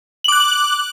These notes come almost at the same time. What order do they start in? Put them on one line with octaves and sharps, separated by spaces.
F#7 D6 F#6